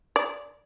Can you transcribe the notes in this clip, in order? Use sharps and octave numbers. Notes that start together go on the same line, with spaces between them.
D5